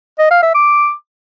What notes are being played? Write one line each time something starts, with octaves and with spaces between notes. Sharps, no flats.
D#5
F5
E5
D6